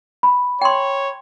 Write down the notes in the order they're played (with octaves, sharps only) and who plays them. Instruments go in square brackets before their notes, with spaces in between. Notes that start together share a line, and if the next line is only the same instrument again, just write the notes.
[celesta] B5
[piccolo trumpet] C#5 [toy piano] G5 C6